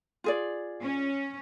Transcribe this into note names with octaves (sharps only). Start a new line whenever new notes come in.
F4 G#4 D5
C#4